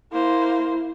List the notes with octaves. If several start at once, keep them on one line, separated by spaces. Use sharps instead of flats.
A#3 E4 C5